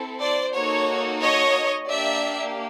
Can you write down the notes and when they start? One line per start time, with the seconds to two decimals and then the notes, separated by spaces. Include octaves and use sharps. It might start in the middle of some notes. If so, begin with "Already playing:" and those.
Already playing: C4 E4 A4
0.21 C5 D5
0.55 A#3 D#4 F#4 A4 C#5
1.21 C#5 D#5
1.88 A#3 D4 G4 D5 E5